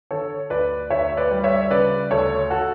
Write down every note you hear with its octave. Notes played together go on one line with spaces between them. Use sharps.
D3 A4 C#5
D2 B4 D5
D2 C#5 E5
B4 D5
G3
C#5 E5
C#3 B4 D5
D2 A4 C#5
F#4 A4